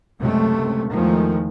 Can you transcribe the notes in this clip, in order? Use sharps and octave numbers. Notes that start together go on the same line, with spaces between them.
C#2 F#2 C3 G#3 A3
E2 D#3 F3 G#3 A3